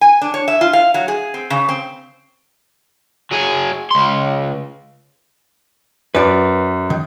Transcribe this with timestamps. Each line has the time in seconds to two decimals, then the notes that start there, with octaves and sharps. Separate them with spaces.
0.01 G#5
0.21 D4
0.34 C#5
0.48 E5
0.61 F4
0.73 F5
0.94 F#3
1.08 G#4
1.34 C4
1.50 C#3
1.69 C4
3.31 F#3 G#4
3.91 C#2 C6
6.15 F#2 B4 D5
6.90 D#3